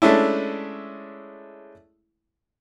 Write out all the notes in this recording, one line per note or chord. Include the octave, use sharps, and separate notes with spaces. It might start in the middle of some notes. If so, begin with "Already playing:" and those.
G#3 A3 C#4 D4 E4